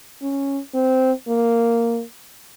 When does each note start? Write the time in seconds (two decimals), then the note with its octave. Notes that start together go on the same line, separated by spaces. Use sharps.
0.22 C#4
0.75 C4
1.28 A#3